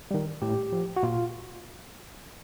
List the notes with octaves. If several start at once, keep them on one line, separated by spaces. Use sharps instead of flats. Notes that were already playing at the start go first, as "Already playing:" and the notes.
D#3 G3
A2 G4
F3
F#4
A#2 F4